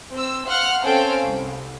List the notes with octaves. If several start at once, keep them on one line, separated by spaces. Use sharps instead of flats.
C4 C5 E6
F5 F#5 C6 F6 F#6
C4 C#4 A4 C5 F5 G5
C2